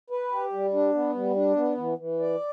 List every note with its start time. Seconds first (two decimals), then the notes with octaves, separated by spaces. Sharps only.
0.10 B4
0.32 G4
0.53 G3
0.73 D4
0.94 B3
1.14 G3
1.36 D4
1.56 B3
1.77 E3
1.98 E3
2.20 D5